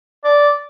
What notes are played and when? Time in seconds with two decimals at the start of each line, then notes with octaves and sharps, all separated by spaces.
0.24 D5